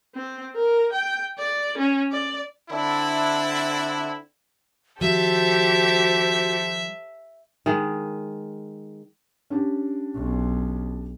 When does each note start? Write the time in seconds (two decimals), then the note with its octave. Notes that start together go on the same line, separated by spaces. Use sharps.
0.15 C4
0.56 A#4
0.93 G5
1.38 D5
1.78 C#4
2.12 D5
2.70 D3 C4 D4 E4
5.01 D#3 F3 G3 F#4 G4 A4 C5 E5
7.66 D#3 G#3
9.50 C#4 D4 G4
10.14 B1